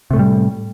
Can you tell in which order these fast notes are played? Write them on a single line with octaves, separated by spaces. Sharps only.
C3 A3 A2 G3